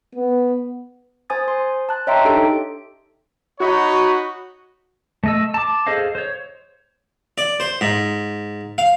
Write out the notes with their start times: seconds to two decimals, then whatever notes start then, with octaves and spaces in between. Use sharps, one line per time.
0.15 B3
1.30 C5 G#5 D#6 A6
1.48 C5 C6
1.89 A5 F#6
2.07 C#5 D#5 E5 G5 A#5 C6
2.25 D4 D#4 G4 A4 D7
3.60 D#4 F#4 C#5 B5
5.24 A3 D#5 E6
5.54 A5 D6
5.87 G#4 A4 C5 D#5 F5
6.15 C5 C#5
7.38 D5
7.60 C5
7.81 G#2
8.78 F5